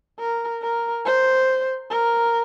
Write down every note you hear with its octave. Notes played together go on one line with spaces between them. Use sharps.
A#4
A#4
C5
A#4